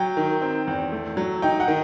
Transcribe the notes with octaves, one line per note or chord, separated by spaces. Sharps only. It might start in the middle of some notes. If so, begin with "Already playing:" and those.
Already playing: F#3 G5
D#3
C4
E2
A3
F#3
D#4 G5
F#5
D#3